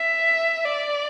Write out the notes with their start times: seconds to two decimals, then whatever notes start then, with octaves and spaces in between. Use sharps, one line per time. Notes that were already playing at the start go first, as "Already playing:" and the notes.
Already playing: E5
0.65 D5